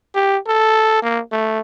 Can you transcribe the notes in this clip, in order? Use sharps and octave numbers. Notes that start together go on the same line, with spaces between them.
G4
A4
A#3
A3